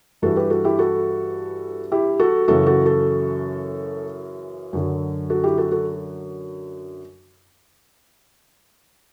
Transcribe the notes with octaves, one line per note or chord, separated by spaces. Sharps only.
G2 E3 F#4 A4
G4 B4
F#4 A4
E4 G4
F#4 A4
E4 G4
F#4 A4
F#2 C#3 E3 F#4 A4
F#4 A4
F#4 A4
F#2 D3 F#3
F#4 A4
E4 G4
F#4 A4
F#4 A4